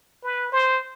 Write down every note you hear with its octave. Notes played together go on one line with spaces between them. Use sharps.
B4
C5